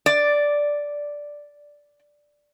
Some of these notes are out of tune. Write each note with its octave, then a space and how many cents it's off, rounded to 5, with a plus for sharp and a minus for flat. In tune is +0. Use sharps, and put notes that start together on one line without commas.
D5 -5